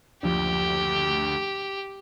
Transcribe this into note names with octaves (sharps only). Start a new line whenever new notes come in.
F#1 D2 F3 D4 G4